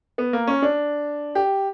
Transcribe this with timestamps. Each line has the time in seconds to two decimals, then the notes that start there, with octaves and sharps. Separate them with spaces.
0.18 B3
0.33 A#3
0.48 C#4
0.62 D4
1.35 G4